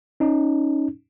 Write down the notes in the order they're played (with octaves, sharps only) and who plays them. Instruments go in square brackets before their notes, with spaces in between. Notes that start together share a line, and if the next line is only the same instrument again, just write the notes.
[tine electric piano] C#4 D#4